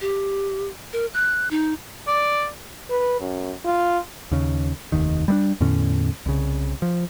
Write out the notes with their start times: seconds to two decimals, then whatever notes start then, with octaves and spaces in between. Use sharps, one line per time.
0.01 G4
0.93 A#4
1.14 F#6
1.51 D#4
2.08 D5
2.90 B4
3.20 F#2
3.65 F4
4.31 D#2 C#3
4.92 F1 D#2 D#3
5.28 G3 G#3 D4
5.60 E2 A2 D3 C#4
6.26 C2 C#3
6.82 F3